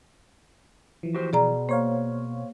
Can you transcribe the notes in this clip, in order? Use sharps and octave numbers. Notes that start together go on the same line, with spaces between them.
E3 F3
F#4 G4 C5
B2 G#4 D5 A#5
A#3 C5 C#5 F5